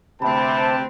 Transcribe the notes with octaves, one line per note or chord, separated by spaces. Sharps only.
D2 C3 C4 B4 G5 A5 B5